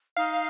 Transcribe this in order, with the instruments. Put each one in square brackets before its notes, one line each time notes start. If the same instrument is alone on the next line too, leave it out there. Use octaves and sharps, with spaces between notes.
[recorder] D#4 [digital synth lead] F5